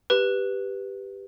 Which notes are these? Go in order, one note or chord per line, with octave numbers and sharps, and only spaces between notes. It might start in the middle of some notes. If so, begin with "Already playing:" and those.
G4 B4